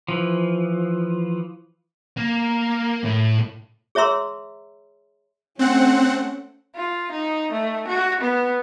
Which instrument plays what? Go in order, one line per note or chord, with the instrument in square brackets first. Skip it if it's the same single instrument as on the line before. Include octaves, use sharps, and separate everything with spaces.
[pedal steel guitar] E3 F3
[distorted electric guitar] A#3
A2
[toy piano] G#4 C#5 E5 A#5 C6 E6
[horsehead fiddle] A3 C#4 [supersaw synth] C4 F#5
[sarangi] F4
D#4
A3
F#4
B3